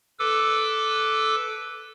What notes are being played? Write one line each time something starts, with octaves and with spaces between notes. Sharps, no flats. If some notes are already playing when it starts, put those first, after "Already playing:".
A4 B4 D6 E6